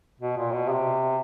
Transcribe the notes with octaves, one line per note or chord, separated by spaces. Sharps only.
B2
A#2
B2
C3